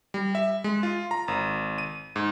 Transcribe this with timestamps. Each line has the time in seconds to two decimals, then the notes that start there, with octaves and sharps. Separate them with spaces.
0.14 G3
0.35 E5
0.64 G#3
0.83 F4
1.11 A#5
1.28 G#1
1.78 D#7
2.16 G#2